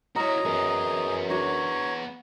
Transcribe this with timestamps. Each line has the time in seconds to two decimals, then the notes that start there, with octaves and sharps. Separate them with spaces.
0.16 E4 F#4 A#4 C#5 D#5 A#5
0.45 F#2 B3 G#4
1.30 D4 F#4 C#5 A#5